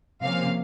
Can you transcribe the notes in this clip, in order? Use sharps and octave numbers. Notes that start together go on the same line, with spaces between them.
C3 F3 A#3 C#4 F5